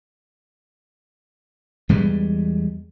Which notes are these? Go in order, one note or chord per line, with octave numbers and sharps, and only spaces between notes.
E2 G3 G#3